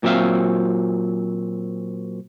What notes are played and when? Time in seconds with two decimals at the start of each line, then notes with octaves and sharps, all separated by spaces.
0.03 A#2 F#3 C4 E5 F5